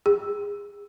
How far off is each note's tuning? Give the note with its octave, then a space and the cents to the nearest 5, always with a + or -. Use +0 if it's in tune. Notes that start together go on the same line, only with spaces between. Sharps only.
G#4 -30